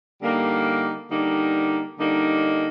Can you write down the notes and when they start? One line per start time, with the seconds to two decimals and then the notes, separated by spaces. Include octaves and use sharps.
0.20 D3 G3 A#3 D#4
1.08 D3 G3 A#3 D#4
1.97 D3 G3 A#3 D#4